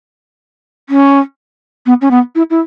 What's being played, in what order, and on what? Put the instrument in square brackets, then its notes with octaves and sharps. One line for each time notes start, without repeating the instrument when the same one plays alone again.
[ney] C#4
B3
C#4
B3
E4
E4